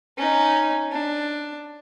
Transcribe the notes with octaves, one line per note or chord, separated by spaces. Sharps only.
C#4 D#4
D4